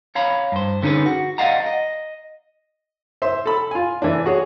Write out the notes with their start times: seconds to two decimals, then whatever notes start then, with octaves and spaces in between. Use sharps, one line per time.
0.15 C#5 F5 A#5 B5
0.52 G2 C5
0.83 D3 C#4 D#4 F4 G#4 B4
1.06 F#4
1.38 D5 D#5 F5 F#5 A#5
1.66 D#5
3.22 C5 E5 C6
3.46 A4 B5
3.71 F4 G#5
4.02 E3 D4
4.26 F#4 G#4 C#5